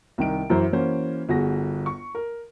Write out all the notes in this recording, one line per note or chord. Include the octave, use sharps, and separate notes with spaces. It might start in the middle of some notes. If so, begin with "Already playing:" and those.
C2 D#3 D7
F#2 E3 E4 C5
E3 A#3 C#4 F#4 C5
G1 F#4 G#4 A#6
C#6
A#4